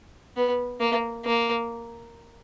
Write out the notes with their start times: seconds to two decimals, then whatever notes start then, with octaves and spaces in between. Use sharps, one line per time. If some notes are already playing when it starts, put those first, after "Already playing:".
0.37 B3
0.80 A#3
1.25 A#3